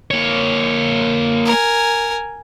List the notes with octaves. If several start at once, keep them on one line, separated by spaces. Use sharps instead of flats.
A#3 C#5
A#4 G#5